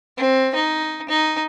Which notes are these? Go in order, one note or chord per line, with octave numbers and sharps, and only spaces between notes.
C4
D#4
D#4